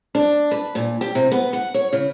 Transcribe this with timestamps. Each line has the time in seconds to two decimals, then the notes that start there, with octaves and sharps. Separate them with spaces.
0.15 D4
0.51 B4
0.75 A#2
1.01 G4
1.15 C3
1.32 B3
1.53 F#5
1.74 C#5
1.93 C#3